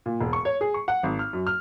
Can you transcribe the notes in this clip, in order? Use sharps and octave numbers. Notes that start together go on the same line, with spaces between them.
A#2
E1
C#6
C#5
G#4
C#6
F#5
G#1
F6
F#2
F6